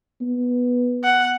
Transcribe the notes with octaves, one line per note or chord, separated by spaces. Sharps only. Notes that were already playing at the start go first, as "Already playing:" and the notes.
B3
F#5